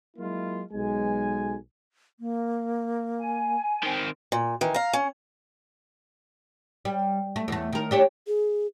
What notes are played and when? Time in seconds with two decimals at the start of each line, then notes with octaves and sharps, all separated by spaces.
0.17 F#3 G#3 A#3 E4 F4
0.72 B1 G#3 G#5
2.20 A#3
3.18 G#5
3.83 D#3 C4
4.32 A#2
4.61 D#3 E3
4.74 F5 A#5
4.93 C#4
6.85 G3
7.36 A3
7.48 E2 A3
7.73 D#3 A#4
7.91 D4 G4 C#5
8.27 G#4